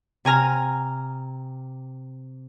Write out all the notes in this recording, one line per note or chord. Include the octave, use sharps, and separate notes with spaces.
C3 G#5 A#5 F6